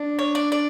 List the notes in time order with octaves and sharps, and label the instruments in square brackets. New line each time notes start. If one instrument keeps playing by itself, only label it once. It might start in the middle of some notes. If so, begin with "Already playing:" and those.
Already playing: [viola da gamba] D4
[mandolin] C#5
D5
D5